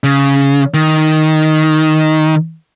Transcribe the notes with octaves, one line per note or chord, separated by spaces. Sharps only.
C#3
D#3